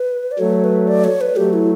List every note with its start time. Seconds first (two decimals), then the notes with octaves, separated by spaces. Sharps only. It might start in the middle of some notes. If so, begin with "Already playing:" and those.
Already playing: B4
0.32 D5
0.39 F#3 A3 C#5
0.64 B4
0.87 D5
1.04 C#5
1.21 B4
1.36 F#3 A3 G4
1.53 E4